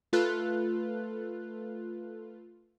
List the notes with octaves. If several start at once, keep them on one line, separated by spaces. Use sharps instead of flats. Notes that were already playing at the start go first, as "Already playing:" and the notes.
A3 F4 A4 B4 F#6